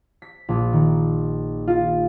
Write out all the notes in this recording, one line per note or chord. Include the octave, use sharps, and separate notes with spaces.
B6
A#1
D#3
F4